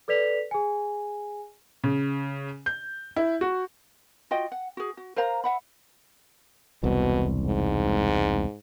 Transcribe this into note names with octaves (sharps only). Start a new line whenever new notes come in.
A4 B4 D5 B6 F7
G#4 G#5
C#3
G6
E4
F#4
F4 F#4 D#5 G5
F#5
F#4 G#4
F#4
A#4 C5 F5 A#5
E5 F#5 B5
E1 C2 B2
G#2